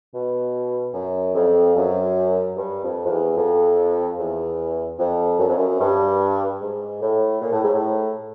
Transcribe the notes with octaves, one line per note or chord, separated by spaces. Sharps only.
B2
F#2
F2
F#2
G2
F2
F2
E2
F2
E2
F2
F#2
F2
F#2
G2
G#2
A2
A#2
A2
G#2
A2